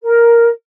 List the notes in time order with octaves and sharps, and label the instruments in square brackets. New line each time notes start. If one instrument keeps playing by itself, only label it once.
[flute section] A#4